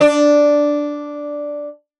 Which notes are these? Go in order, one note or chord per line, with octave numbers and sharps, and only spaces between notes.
D4 D5